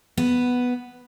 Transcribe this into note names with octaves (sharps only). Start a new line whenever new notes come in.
B3